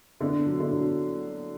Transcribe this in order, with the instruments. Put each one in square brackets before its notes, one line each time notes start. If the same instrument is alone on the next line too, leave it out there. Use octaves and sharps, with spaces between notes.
[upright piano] D3 [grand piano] B3
[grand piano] F#3
[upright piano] D3
[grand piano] F#3